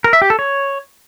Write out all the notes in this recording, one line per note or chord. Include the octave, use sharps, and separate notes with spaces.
A#4
E5
G4
A4
C#5